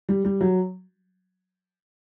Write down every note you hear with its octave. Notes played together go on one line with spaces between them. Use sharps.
G3
G3
F#3